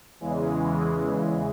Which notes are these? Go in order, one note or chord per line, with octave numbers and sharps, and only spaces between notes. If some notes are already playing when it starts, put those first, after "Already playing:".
E2 C#3 E3 G#3